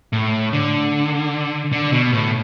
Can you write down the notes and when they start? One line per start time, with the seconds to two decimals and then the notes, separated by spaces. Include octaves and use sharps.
0.13 A2
0.53 D3
1.72 D3
1.92 B2
2.13 A2